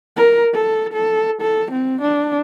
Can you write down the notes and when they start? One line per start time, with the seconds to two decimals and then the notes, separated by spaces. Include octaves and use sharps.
0.17 A#4
0.54 A4
0.94 A4
1.42 A4
1.72 C4
2.02 D4